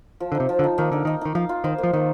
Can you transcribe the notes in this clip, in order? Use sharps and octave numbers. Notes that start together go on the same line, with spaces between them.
F3
D3
D#4
C3
F3
D3
D#4
D#3 A#3
D3 D#4
D#3 D#4
D#3 D#4
F3 F5
F4
D#3 C5
A#3
F3
D#3 A#3